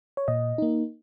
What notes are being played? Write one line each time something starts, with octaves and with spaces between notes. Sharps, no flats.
C#5
A#2 D#5
A#3 D#4